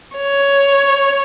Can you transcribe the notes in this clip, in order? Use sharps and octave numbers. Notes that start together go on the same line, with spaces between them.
C#5